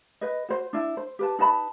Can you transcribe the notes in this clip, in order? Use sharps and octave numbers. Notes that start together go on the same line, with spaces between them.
B4 D#5
F#4 C5
D4 E4
C5
G4 B4 A5
D#4 B4 A5 B5